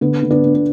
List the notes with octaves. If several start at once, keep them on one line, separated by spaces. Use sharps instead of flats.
D3 B3
D3
B3 D4
D3
B3